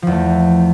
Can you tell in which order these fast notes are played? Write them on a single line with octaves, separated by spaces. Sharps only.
F3 E2 A3